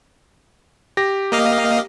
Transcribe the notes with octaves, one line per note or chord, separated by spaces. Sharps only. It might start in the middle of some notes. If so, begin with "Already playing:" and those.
G4 A#6
A#3 D#5 F5